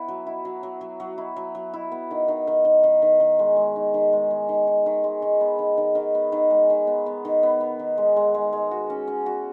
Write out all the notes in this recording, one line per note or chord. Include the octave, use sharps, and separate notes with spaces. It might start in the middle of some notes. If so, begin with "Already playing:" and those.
Already playing: B3 E4
F#3
E4
F#3
F#3
F#3
F#3
E4
F#3
F#3
E4
B3
D#3
D#3
D#3
D#3
D#3
D#3
D#3
G#3
G#3
D#4
D#3
G#3
G#3
D#3
D#4
D#3
G#3
D#3
B3
D#3
D#3
D#3
B3
D#3
G#3
D#3
B3
B3
D#3
B3
B3
D#3
G#3
G#3
G#3
G#3
F#4
C#4
C#4
F#4